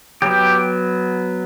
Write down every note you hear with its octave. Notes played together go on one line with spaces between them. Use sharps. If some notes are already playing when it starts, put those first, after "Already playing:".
F#3 B3 G4